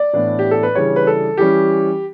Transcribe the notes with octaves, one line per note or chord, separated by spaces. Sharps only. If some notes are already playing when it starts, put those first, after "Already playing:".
Already playing: D5
A2 E3 B3 D4
G4
A4
B4
C#3 E3 G3 D4 C#5
B4
A4
E3 G3 C#4 G4